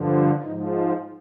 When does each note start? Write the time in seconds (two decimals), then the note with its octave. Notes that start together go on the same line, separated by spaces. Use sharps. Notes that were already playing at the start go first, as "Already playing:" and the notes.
Already playing: G2 D3 F3
0.42 G#2 F3 D#4